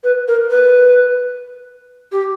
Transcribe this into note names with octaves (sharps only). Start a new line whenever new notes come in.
B4
A#4
B4
G4